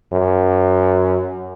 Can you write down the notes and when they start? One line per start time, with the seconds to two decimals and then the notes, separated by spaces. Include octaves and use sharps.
0.13 F#2